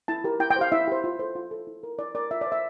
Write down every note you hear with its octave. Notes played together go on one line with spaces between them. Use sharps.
E4 A5
G4 A#4
E4 G5
G5
G4 C5 F5
E4 E5
G4 C5
F4
A4 C5
F4
A4 C5
E4
A#4
E4 D5
A#4 D5
F4 E5
D5
C5
E5